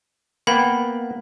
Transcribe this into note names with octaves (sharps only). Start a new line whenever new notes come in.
A#3 B3 F#5 G5 B5